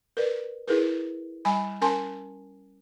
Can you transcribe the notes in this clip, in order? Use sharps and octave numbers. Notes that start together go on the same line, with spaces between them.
A#4 B4 D5
E4 G#4 A#4 B4
G3 G#5 B5
C#4 A#4 G#5 A5 C6